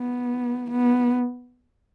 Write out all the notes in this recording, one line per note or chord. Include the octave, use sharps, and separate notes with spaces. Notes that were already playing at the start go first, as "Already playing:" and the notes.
Already playing: B3
B3